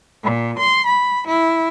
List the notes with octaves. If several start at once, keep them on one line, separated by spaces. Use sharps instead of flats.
A#2
C6
B5
E4